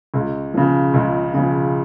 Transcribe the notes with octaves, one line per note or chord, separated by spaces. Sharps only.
C#2
C#3 F3
C#2
C#3 F3